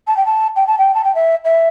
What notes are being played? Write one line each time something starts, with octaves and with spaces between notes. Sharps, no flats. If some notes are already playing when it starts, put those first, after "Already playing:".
A5
G5
A5
G5
A5
G5
A5
G5
E5
E5